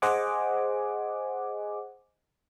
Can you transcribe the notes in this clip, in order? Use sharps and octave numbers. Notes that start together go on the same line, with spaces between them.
G#4 C5 D#5 F#5 G#5 D6